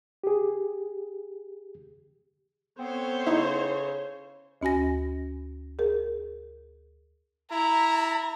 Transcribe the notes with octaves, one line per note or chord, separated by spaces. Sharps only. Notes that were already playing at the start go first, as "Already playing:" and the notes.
G4 G#4
B3 C4 A4 C5 C#5
C#3 D#4 E4
D2 C#4 F#4 G#5 A#6
G#4 A#4
E4 A#5